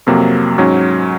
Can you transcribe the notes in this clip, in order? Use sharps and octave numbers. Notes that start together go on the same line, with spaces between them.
F2 C3 F#3 A#3
G#2 F#3 C#4